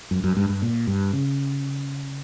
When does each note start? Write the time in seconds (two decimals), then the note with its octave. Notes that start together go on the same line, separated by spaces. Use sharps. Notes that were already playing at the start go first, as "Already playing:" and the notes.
0.11 F#2
0.24 F#2
0.37 G2
0.49 G2
0.62 A#2
0.87 G2
1.13 C#3